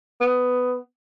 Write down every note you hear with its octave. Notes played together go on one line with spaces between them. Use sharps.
B3